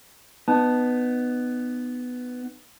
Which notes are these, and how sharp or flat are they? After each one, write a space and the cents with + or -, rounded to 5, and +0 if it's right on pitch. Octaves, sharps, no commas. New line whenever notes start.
B3 +10 D#4 -25 A5 +0